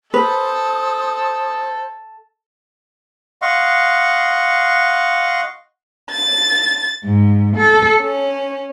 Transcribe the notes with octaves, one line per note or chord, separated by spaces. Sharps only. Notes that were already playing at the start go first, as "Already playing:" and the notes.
A4 B4 C5 D#6
D#5 F5 F#5 C6 C#6
A6
G#2
A4
C#4